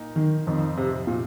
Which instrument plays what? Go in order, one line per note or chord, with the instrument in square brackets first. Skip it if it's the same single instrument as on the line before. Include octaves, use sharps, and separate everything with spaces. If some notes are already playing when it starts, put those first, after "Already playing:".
Already playing: [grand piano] A#2 A#3 D#4
[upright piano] D#3
[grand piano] F2 F3 C4 D#4 [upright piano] D#3
[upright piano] C3
A#2